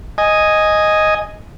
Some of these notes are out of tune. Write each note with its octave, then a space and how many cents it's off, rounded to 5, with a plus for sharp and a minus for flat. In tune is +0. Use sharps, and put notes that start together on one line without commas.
D#5 +0 G#5 +0